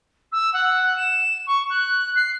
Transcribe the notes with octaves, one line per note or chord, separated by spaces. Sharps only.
E6
F#5
E7
C#6
F#6
C7